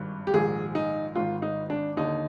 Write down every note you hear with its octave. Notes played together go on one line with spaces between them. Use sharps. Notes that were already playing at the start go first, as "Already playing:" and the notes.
Already playing: G#1 G2 D#3
G4
A#1 G#2 D#3 G#4
D#4
G#1 G#2 D#3 F4
D#4
D4
D#2 D3 D#4